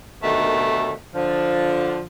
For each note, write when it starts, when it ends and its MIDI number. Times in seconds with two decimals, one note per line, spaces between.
0.22 0.92 39
0.22 0.92 47
0.22 0.92 50
0.22 0.92 51
0.22 0.92 57
1.14 2.02 50
1.14 2.02 53